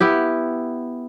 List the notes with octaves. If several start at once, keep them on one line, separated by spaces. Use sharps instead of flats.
B3 E4 G4